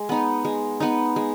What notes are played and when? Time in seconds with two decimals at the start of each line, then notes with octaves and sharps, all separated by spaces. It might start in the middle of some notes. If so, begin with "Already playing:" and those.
Already playing: G#3
0.09 B3 D#4
0.45 G#3
0.80 B3 D#4
1.16 G#3